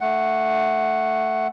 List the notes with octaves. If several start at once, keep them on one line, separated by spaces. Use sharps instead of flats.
A3 F#5